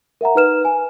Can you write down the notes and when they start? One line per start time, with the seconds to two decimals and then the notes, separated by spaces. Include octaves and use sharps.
0.21 A#4 E5 F#5 A#5
0.35 D#4 B4 F6 E7
0.65 G#5